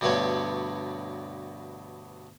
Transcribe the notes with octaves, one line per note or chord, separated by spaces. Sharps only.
D2 G2 B2 B3 B4 C#5